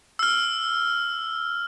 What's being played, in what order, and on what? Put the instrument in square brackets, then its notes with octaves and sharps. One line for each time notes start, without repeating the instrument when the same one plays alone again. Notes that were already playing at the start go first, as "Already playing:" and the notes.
[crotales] E6 F6